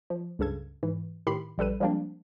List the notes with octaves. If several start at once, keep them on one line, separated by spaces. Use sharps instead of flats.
F3
C#2 G2 C#3 A4 G#6
G#2 E3
A2 D#3 G4 B5 C6 C7
A#1 G3 A4 B4 D#7
F3 G3 G#3 A#3 C4 D4